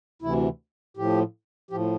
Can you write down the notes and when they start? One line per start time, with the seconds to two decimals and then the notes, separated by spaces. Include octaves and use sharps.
0.22 D2 C3 E3 E4
0.97 A2 F3 G4
1.71 A2 F3 G4